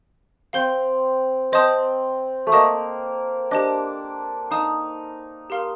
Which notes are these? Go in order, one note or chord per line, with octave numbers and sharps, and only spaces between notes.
C4 F5 C6 G6
C4 C5 D#5 A5 D#6 G6
A3
A#3 D#5 A5 D#6
D4 G4 C5 D#5
D#4 F5 A5 D#6
G4 A#4 F5 C6 F6